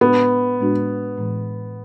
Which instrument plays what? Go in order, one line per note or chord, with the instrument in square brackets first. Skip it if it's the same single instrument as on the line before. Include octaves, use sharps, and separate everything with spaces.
[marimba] A2 G#3 D4 F#4 [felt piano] B3
[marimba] A2 G#3 D4 F#4
A2 E3 G#3